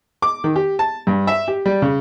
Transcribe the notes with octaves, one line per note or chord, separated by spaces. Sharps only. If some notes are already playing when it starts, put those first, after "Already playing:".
D6
D#3
G4
A5
G2
E5
G4
G3
C#3